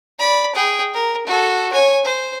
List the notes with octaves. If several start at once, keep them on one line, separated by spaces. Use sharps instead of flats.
D5 B5
G#4 G5
A#4
F#4 A4
C#5 G#5
C5